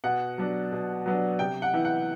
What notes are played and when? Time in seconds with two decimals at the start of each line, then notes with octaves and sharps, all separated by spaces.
0.04 B2 F#5
0.38 F#3 B3 D4
0.72 B2
1.06 F#3 B3 D4
1.39 C3 G5
1.62 F#5
1.73 E3 B3 E4
1.85 F#5